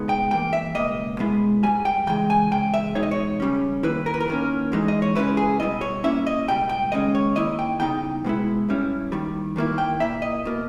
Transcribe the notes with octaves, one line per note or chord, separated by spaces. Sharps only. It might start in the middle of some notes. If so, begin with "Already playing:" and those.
Already playing: C#2 B2 G#3 B3 D#4
G5
G2 E3 A#3 G5
E5
C#2 B2 A#3 D#5
B2 G#3 B3 E4
G#2 E3 G3 G#5
G5
C#3 E3 G#3 G5
G#5
E2 C#3 G#3 G5
E5
E2 B2 G#3 D#4 C#5
D#5
C#5
C#3 G3 C#4
D#2 D#3 A#3 E4 B4
A#4
B4
A#4
D#2 D#3 A#3 C#4
G#2 E3 G#3 D#4
D#5
C#5
C#2 C#3 G#3 C#4 E4 B4
G#4
B2 G3 B3 E4 D#5
C#5
A#2 A#3 C#4 E4 E5
D#5
C#2 B2 G3 G5
G5
D#2 C#3 G#3 C#4 D#5
C#5
D#2 D#3 A#3 E4 D#5
G5
C#3 G3 B3 D#4 G5
B2 G#3 B3 E4
G2 G3 C#4 E4
D#2 D#3 G3
D#2 D#3 A#3 E4
G5
A#2 A#3 E4 E5
D#5
B2 A#3